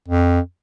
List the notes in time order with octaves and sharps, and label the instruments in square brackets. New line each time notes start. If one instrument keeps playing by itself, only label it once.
[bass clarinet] F2